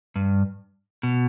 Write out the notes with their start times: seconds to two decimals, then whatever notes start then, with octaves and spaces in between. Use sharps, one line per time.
0.16 G2
1.03 B2